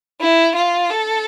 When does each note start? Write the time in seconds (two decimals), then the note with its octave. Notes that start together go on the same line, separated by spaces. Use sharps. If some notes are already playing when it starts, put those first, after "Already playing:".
0.21 E4
0.56 F4
0.90 A4